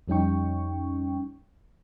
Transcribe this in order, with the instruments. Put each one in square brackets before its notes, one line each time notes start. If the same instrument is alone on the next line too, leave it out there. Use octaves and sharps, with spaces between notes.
[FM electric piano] F2 G3 C#4 D#4 G5 C#6